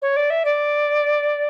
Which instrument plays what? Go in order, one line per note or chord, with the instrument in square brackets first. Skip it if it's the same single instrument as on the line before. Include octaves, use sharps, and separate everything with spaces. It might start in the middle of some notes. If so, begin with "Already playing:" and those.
[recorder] C#5
D5
E5
D5